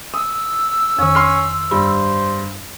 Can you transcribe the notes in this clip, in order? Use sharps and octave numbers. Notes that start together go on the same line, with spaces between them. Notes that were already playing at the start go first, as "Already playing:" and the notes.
D#6 E6
F2 D#3 C#4
C6 F6 C7
G2 C5 B5